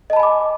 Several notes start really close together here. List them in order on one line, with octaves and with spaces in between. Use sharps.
D#5 A5 B5 G#5 D6